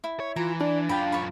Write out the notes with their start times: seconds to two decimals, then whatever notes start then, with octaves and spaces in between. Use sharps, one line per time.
0.04 E4
0.20 C#5
0.36 E3 F4 A#5
0.61 D4 D5
0.89 F#2 F4 F5 G5 B5
1.12 C#5 B5